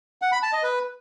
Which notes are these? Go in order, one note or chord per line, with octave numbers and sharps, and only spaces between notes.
F#5
B5
A5
D#5
B4